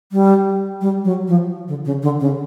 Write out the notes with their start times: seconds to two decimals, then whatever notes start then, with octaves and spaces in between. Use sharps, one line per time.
0.12 G3
0.81 G3
1.04 F#3
1.28 F3
1.68 D3
1.85 C#3
2.02 D3
2.20 C#3